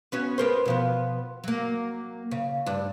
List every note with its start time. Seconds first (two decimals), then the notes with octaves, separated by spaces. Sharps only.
0.12 B3 C#4 F#4
0.38 B3 A#4 C5
0.66 B2 F3 B3
1.44 F#3 A#3
2.31 C#3
2.66 G2 D4